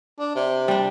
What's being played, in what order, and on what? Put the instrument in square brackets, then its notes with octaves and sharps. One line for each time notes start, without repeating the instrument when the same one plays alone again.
[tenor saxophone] D4
C3
[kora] G3 D4